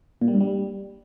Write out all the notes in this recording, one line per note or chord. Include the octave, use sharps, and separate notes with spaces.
A#2
G3
G2
G3